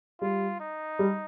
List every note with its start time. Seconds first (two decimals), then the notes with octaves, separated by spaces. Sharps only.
0.21 G3 F4
0.60 D#4
0.99 G3